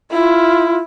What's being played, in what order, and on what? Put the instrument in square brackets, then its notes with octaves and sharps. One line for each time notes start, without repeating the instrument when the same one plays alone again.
[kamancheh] E4 [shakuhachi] F4